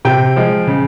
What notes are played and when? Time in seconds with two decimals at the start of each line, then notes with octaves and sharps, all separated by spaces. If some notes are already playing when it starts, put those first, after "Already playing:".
0.05 C3 G5
0.36 F3 G#3
0.67 C#3